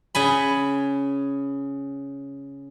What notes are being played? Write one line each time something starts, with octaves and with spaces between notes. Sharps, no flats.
C#3 G#5 B5